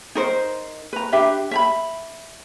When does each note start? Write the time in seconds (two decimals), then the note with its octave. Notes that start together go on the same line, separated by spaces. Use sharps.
0.15 D#4 A#4 C5
0.93 B4 A#5
1.12 D4 G4 B4 E5
1.51 E5 A#5 B5